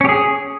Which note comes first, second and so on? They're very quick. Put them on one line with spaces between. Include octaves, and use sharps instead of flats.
C#4 G4 G#4